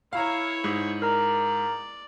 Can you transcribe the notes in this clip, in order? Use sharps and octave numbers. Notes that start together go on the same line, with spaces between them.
E4 C#5 F5 A#5
G#2
A#4 D5 A#5